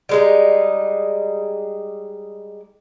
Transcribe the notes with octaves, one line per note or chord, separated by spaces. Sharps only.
G3 G#3 D#4